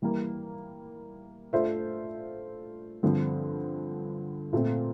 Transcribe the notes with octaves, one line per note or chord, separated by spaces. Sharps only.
E3 G3 A#3
A3 D4 F4 C5 E5
G2 D3 F3 C4
A#2 A3 C4